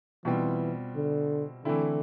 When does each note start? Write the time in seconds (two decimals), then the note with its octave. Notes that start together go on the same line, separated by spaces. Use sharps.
0.25 B2 E3 G3 C4 F4
0.95 D3
1.65 D3 E3 A3 C4 E4